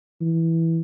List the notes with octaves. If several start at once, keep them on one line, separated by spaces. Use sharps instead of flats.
E3